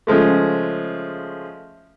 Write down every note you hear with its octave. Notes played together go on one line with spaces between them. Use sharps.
C#3 F3 G#3 A3